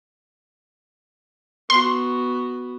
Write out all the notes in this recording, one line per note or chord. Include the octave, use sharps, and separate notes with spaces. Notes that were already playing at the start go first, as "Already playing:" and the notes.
B3 F#4 C6